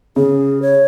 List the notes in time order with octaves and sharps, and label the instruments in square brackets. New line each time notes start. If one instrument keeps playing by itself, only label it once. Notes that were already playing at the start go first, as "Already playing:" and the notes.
[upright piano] C#3 [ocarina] G#4
[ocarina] C#5